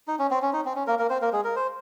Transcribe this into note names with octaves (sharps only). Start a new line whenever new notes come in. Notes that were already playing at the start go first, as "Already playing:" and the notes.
D#4
C#4
C4
C#4
D#4
C4
C#4
A#3 A#4
A#3 A#4
C4 C5
A#3 A#4
G#3 G#4
A#4
C5